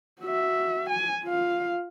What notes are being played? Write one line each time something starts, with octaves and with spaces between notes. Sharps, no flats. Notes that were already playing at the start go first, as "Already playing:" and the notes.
F#4 E5
G#5
F4 F5